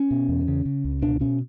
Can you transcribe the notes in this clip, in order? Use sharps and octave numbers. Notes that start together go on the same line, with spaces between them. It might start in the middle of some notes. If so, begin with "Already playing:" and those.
Already playing: C#4
B2
E2
C#3
C#3
C#2
B2 D4
B2 C#4